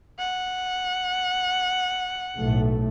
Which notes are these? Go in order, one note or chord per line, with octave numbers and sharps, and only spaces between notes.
F#5
B1 A2 A3